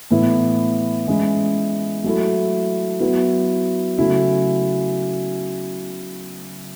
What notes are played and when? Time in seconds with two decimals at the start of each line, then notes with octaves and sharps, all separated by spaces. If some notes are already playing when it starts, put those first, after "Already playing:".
0.11 A2 E3 B3 E4
1.08 E3 G#3 C#4 E4
2.04 F#3 A3 E4
3.00 F#3 B3 E4
3.98 C#3 F#3 A3 C#4 E4